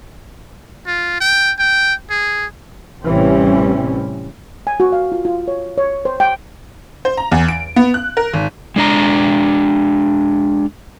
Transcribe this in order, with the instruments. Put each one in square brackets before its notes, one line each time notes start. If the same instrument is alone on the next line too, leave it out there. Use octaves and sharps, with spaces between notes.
[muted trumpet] F4
G5
G5
G#4
[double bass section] A1 C3 E3 G3 C4 C#4
[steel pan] G#5
F#4
F5
F4
F4
C#5
C#5
C5
G5
[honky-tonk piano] C5
A#5
E2
D7
B3
F#6
A#4
G#1
[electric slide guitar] G#3 D4 A#5